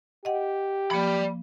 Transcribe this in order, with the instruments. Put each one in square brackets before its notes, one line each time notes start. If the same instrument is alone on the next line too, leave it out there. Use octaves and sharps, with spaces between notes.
[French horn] G4 [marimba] D#5 F#5
[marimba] F3 A#3 [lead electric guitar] D5 B5